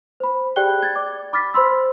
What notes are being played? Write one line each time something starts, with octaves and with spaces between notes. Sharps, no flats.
C5 B5
G4 G#4 D5 G5 F#6 G7
G#6 A6
D5 D6
B5 D6 F6 A6 B6
C5 B5 C6 E6